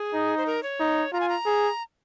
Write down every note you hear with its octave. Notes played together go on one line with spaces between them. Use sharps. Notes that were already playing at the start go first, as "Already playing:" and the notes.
Already playing: G#4
D#4
C5
A#4
C#5
D#4
F4 A#5
G#5
A#5
G#4